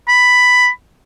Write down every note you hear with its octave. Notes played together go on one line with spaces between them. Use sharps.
B5